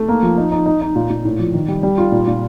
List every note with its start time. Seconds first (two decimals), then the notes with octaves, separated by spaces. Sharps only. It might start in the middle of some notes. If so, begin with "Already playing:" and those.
Already playing: A3
0.08 A#3
0.23 F3
0.37 D#4
0.52 D#4
0.66 D#4
0.81 D#4
0.96 A#2
1.10 A#2
1.25 A2
1.39 F3
1.54 D#3
1.68 G3
1.83 G3
1.98 F4
2.12 A#2
2.27 A#2